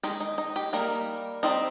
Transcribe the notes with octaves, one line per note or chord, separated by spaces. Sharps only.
D#3 G#3 D#4 G4
D#4
D#4
G4
G3 A#3 D#4 A#4
G3 C4 D#4